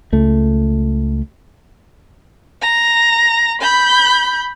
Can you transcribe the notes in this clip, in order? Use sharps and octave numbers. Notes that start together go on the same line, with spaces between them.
C#2 A3
A#5
B5 G6